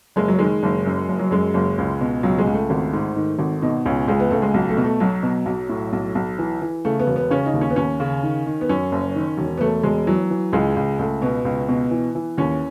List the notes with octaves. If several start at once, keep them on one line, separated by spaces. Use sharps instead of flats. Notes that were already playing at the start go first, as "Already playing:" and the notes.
F#1 G#3
F#3
D#3 G#3
F#1
F#2
F#1
F#3
F#2 G#3
F#1
C#2
B2
C#2 F#3
G#3
C#2
A3
G#1
G#2
D#3
G#1
B2 D#4
C#2 C#4
C#2 G#3
B3
C#2 A3
G#3
B1
A3
B2
A3
B1 F#3
B2
B1
A2
B1
B1
E3
E3
C#3 A3
B3
E1
B3
C#3 C#4
D#4
D#2
C#4
B3
D#2 C#4
C#3
D#3
D#3
B3
F#2 C#4
F#1
D#3
E1
B3
E1 A3
E1 G#3
E3 F#3
E3
C#2 G#3
C#2
C#2 A3
B2 B3
C#2
B2
E3
E3
D#2 C#4